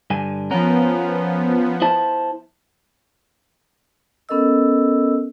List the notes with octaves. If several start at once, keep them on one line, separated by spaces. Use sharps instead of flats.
G2 D3 G#5
F3 B3 C#4 A#4
E4 C5 A5
B3 C#4 A4 A#4 D#5 E6